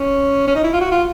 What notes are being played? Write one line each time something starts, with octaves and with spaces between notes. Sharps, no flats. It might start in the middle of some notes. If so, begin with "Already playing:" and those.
Already playing: C#4
C#4
D#4
E4
F4
F#4
F4